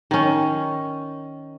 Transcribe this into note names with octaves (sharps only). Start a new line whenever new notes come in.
D#3 C#4